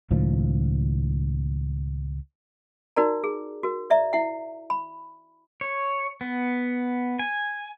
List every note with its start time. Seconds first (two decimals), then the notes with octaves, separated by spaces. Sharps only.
0.11 C#2 A2 D#3 F3
2.96 D#4 F#4 A#4 D5 A#5
3.24 G#4
3.63 F#4 A#4
3.90 D5 E5 A#5
4.13 E4 E5 F#5
4.70 B5
5.61 C#5
6.21 B3
7.19 G#5